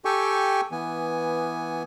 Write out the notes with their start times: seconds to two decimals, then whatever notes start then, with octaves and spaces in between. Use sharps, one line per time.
0.05 G4 A4 G5 G#5 C#6
0.72 E3 B3 G#5